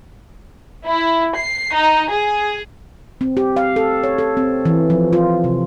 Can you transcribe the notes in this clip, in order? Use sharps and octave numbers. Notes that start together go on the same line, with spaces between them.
E4
C7
D#4
G#4
C4
G4
F5
A4
C#5
A4
C4
E3
F3
F4
C3